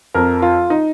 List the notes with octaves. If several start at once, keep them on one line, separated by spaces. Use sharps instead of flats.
F2 F3 A#4
F4
D#4